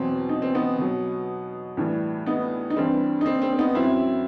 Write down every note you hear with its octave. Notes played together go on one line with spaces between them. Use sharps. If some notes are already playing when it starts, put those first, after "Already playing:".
Already playing: E2 B2 F#3 C4
D#4
C4
B3 D#4
B2 F#3
A2 E3 G3
B3 D#4
D#4
G2 E3 G3 C4
D#4
C4
C4
C4
B3 D#4
F#2 F#3 C4 E4